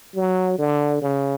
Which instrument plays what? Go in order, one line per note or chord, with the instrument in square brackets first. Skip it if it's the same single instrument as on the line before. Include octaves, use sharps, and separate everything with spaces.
[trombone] F#3
D3
C#3